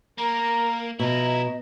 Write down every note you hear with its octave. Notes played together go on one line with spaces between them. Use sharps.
A#3 A#4 A#5
B2 F3 E4 D#5 A#5